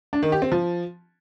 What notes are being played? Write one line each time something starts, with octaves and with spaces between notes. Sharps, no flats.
D4
D#3
G4
C4
F3